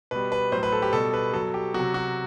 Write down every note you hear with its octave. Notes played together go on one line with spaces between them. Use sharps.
B2 G3 B4
B4
A2 F#3 C5
B4
A4
G4
B2 G3 A4
B4
B2 F#3 A4
G4
C3 F#3 F#4
F#4